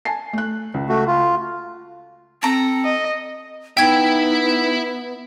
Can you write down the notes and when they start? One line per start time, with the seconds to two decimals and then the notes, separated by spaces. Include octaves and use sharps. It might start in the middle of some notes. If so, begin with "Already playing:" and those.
0.05 G#5 A5 C7
0.33 A3 F#6
0.74 C#2
0.89 A3 F#4
1.07 F4
2.43 C4 A4 A#5
2.84 D#5
3.77 B3 D#4 E4 E5 G5 G#6